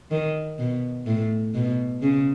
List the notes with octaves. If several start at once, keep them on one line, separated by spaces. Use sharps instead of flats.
D#3
B2
A2
B2
C#3